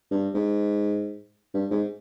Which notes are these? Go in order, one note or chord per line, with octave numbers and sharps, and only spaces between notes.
G2
G#2
G2
G#2